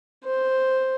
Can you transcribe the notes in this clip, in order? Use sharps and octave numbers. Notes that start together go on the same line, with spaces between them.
C5